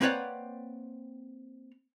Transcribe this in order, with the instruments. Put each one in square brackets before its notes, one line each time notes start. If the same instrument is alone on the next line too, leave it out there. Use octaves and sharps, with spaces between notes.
[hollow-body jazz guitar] A#3 C4 B4 C#5 D5 F#5